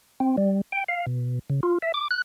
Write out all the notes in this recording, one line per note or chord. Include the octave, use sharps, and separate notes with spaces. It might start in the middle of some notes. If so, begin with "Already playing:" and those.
C4
G3
G5
F5
B2
C#3
F4
E5
D6
F#6